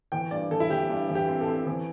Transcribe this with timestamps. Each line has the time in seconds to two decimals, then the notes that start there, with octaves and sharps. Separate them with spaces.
0.12 E3 G5
0.31 G2 D5
0.51 E3 A4
0.60 E4
0.70 E3 G4
0.90 G2
1.09 E3
1.15 G4
1.29 C4
1.41 A4
1.48 C4
1.66 E3